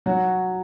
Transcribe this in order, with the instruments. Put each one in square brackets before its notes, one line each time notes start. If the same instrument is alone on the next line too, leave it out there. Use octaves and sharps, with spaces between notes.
[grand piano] F#3 F#4